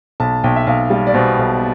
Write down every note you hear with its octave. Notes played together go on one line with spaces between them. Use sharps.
B1 A5
B1 G5
E5
B1 F5
G3 F5
D5
B2 C5
B1